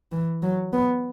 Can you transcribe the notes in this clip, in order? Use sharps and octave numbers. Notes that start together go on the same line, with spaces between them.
E3
F#3
B3